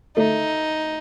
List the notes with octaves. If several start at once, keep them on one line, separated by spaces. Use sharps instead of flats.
A3 D#4